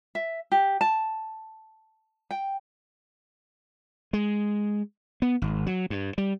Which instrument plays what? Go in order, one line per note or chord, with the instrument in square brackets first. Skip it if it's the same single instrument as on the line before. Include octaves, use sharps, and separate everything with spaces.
[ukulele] E5
G4
A5
G5
[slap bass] G#3
B3
G#1
F#3
G2
G3